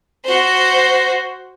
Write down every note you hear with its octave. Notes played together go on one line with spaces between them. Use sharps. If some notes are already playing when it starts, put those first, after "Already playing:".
F#4 C5